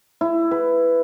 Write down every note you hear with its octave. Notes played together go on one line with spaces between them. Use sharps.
E4
B4